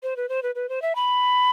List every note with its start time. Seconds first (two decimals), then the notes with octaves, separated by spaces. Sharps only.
0.03 C5
0.17 B4
0.29 C5
0.43 B4
0.55 B4
0.69 C5
0.82 E5
0.95 B5